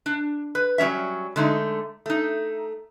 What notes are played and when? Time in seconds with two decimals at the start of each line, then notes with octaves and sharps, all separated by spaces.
0.06 D4
0.55 B4
0.78 F#3 G3 C#4 E5
1.36 D3 G#3 A3 D#4
2.06 A3 D#4